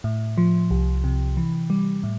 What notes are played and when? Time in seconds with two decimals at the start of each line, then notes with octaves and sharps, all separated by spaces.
0.04 A2
0.37 F3
0.71 C2
1.04 C3
1.37 E3
1.70 G3
2.04 A2